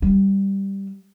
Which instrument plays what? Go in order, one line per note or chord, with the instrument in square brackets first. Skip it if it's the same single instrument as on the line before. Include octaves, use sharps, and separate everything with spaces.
[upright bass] G3